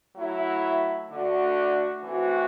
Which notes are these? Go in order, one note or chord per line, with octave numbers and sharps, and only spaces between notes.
F#3 A3 E4
D3 A3 D4 F#4
E3 A3 C4 F#4